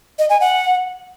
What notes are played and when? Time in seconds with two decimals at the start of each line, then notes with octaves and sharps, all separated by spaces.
0.19 D#5
0.30 G#5
0.41 F#5